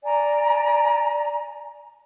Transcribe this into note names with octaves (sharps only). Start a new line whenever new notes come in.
D5 G#5 A#5